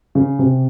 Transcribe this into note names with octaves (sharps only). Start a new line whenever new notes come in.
C#3
C3